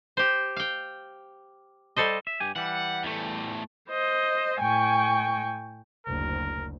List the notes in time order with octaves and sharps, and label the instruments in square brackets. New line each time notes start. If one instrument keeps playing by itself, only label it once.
[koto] G4 C5
F5 G5
G3 A4 C5 D#5
[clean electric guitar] E5
G2 G4 G#5
[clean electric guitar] E3 G3 [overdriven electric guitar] F#5
[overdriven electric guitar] E2 A3
[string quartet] C5 D#5
A2 G5 G#5 C#6
[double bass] F#1 D2 [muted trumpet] A#4